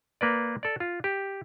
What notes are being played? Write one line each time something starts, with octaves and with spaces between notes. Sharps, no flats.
A#3 B4 D5
A4 D5
F4
G4